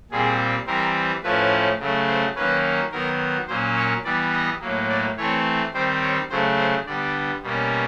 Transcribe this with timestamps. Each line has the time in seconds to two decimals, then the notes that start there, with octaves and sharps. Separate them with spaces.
0.10 A#2 G3 C4 G#4
0.66 E3 G3 C4 A#4
1.23 A2 F3 A3 C#4 B4
1.79 C#3 F#3 A3
2.08 C5
2.35 D#3 F#3 A#3 C#4 B4
2.91 D#3 F#3 B3 A#4
3.48 A#2 F#3 A#3 C#4 C5
3.76 C#5
4.04 E3 G3 B3 D5
4.33 D#5
4.61 A2 F#3 A#3
4.89 D5
5.17 E3 A3 C4 C#5
5.73 D#3 G3 C4 C5
6.02 C#5
6.30 C#3 F#3 A3 C5
6.57 C5
6.86 D3 G3 B3 D5
7.43 B2 G3 A#3 C#4